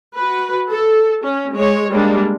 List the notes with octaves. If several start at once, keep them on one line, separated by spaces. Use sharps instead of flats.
F#4 B4
A4
C#4
G#3 C#5
G3 G#3 A#3 D4